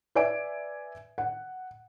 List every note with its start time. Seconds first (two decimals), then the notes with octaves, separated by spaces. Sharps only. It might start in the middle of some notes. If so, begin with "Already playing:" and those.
0.15 B4 D5 E5 G#5 D7
1.18 F#5